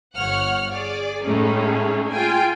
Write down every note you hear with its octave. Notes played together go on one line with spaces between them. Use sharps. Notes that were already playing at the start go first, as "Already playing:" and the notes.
G1 C#5 F#5 F6
G#4 D5
A2 G#3 A3 C#4 D#4 G#4
F4 G#4 G5 G#5